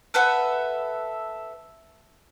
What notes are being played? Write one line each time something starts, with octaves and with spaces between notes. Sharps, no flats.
A4 B4 E5 F#5